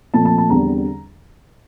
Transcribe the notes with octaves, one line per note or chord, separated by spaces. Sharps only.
A#2 F3 A3 C4 A5
A5
A5
E2 D3 G3 C4 A#5